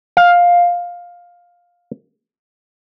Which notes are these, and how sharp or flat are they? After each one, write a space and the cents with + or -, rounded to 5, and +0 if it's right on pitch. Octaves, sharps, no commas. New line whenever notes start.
F5 +10